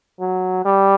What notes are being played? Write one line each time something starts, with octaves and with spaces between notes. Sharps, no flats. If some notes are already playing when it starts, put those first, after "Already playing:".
F#3
G3